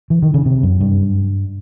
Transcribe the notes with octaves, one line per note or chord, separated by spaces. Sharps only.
E3
D#3
C#3
C3
F#2
G2